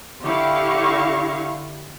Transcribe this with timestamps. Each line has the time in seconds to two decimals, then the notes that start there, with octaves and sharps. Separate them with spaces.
0.22 D3 E4 G4 F5 C#6